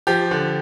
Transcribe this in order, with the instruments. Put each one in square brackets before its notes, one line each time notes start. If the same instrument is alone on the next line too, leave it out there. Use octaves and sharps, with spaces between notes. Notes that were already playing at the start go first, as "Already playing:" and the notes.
[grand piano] F3 G4
D3